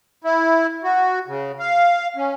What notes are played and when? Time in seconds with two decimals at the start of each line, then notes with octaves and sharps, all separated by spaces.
0.24 E4
0.84 F#4
1.28 C#3
1.59 F5
2.16 C#4